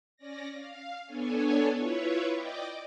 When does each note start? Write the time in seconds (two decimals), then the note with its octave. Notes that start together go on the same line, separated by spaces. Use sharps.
0.17 C#4 D5 A#6
0.54 F5
1.06 B3 D4 A4 C#5 G#5
1.73 E4 F4 B4 C#5 E5
2.31 D5 D#5 G5 D6